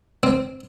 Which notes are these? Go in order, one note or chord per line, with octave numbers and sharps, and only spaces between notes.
C4